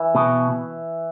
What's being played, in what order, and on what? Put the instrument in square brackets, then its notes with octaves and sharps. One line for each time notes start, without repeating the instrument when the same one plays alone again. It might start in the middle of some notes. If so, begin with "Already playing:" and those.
Already playing: [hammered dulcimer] E3
[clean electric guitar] B2